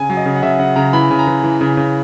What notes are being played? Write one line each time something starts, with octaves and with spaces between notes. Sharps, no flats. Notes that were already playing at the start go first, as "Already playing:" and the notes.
Already playing: C#3 G#5
F#3
D#5
C#3
F#5
C#3 E5
C#3 F#5
C#3 A#5
E3 B5
C#3 G#5
A#5
E3
E3
C#3
C#3